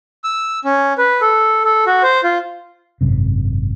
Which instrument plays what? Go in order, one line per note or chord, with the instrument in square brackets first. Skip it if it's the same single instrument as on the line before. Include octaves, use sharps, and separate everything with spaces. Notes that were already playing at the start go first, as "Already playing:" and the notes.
[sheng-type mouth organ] E6
C#4
B4
A4
A4
F#4
C5
F4
[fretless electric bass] G#1 F#2 C3